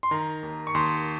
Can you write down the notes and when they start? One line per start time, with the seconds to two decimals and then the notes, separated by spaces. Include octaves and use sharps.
0.03 C6
0.11 D#3 A#5
0.43 D#2
0.67 C#6
0.75 D#2 C6